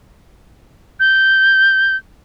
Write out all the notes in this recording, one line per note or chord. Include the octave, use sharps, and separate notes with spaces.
G6